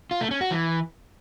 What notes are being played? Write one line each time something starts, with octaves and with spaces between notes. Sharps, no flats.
F4
A3
C#4
F#4
E3